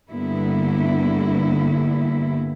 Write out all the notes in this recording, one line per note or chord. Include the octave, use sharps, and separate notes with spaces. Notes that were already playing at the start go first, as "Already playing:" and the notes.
G2 D3 G3 A#3 B3 E4